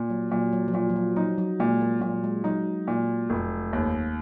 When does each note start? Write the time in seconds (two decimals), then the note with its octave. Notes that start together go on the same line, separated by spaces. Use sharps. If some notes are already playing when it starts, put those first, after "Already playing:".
Already playing: A#2
0.10 F#3
0.31 A#2 F#3
0.53 F#3
0.68 F3
0.74 A#2 F#3
0.89 F3
0.96 F#3
1.16 F#3 D#4
1.38 F#3
1.60 A#2 G#3
1.81 A#3
2.01 A#2 F#3
2.24 G#3
2.44 F#3 D#4
2.88 A#2
3.30 F1
3.73 D#2